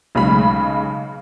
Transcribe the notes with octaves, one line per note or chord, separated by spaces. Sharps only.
B1 C#3 G#3 B5